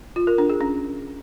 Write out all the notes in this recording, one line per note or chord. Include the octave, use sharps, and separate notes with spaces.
F4
A#4
D4
G#4
C#4